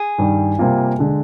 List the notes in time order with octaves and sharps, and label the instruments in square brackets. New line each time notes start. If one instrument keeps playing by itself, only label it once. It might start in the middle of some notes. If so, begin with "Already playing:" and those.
Already playing: [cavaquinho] G#4
[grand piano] G2 D#3 G3
C3 G3 A#3 F4
D3 G#3